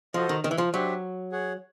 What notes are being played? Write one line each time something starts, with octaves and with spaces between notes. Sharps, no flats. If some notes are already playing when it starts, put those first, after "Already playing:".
F3 F#4 A4 C5 D#5
D#3
D#3
E3
F3
F#3 D4 G4 C5 E5
G#4 C#5 F#5